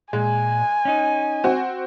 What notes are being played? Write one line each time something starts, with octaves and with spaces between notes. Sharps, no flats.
A#2 G#3 G#5
C#4 D#4
C4 F#4